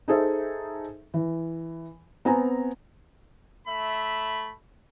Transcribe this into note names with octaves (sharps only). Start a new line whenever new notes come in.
D#4 G#4 A4 C5 E5
E3
B3 C4 G#5 A#5
A3 E5 B5